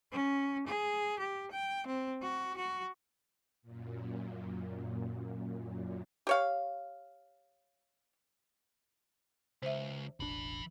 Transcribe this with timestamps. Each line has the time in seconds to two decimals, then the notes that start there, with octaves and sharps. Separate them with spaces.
0.12 C#4
0.67 G#4
1.19 G4
1.51 G5
1.86 C4
2.22 F#4
2.57 F#4
3.62 F#2 A#2
6.27 G4 C#5 F5
9.63 C#2 C5 E5
10.20 E1 A1 E3 D4 B5